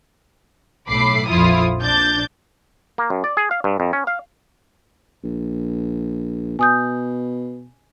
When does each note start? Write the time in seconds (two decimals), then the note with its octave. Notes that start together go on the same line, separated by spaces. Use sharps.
0.88 B1 A2 B5 D6 C7
1.28 A#1 F2 F3 E4 F4 D#6
1.81 A#1 D4 G6 A6
2.98 A#3
3.10 F#2
3.24 D5
3.37 G#4
3.51 F5
3.64 G2
3.80 F2
3.93 C#4
4.07 F5
5.24 A#1
6.59 B2 G#5 D#6 G6